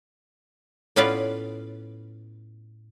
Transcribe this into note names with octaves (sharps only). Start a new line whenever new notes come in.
A2 B3 C#4 F4 B4 D5